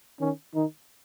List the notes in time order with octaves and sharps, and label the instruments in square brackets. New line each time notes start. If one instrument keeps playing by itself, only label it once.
[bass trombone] D#3 [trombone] C#4
[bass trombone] D#3 [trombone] D#4